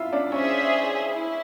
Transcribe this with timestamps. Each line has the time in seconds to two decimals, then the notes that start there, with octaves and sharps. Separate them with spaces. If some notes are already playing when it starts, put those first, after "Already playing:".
Already playing: E4 F4 E5 F5
0.13 D4 D5
0.32 C#4 G#4 C5 C#5 E5
1.11 E4